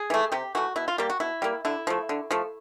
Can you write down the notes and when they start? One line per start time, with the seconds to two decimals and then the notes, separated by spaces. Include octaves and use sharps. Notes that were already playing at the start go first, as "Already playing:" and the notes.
Already playing: G#4
0.10 E3 A3
0.32 C3 G4
0.55 E3 A3 F#4
0.76 B2 E4
0.88 F4
0.98 G3 A#3 G4
1.10 F#4
1.20 B2 E4
1.42 G3 A#3
1.65 D3 E4
1.87 F3 A3
2.09 D3
2.31 F3 A3